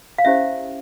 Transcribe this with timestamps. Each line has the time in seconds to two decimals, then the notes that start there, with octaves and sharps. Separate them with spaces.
0.18 F5
0.25 C#4 E4 G4 C5 E5